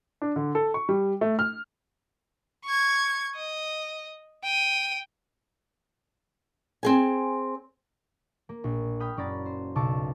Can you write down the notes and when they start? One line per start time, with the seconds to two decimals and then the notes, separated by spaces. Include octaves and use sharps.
0.22 D4
0.36 D3
0.55 A4
0.74 C#6
0.89 G3
1.21 A3
1.39 F6
2.65 C#6 G#6
3.36 D#5
4.44 G5 D#7
6.83 C4 G#4 G#5
8.49 A#3
8.64 A#1
9.00 G5 B5 D#6 F6 F#6
9.17 F#1 C#4 D5 A#5 B5 A6
9.46 C5
9.75 B1 C#3 A5 C#6 D6 E6